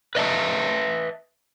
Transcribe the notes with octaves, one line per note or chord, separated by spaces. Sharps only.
B4 D#5 E5 A5